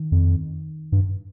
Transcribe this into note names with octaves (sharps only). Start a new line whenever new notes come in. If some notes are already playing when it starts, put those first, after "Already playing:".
Already playing: D#3
F2
G2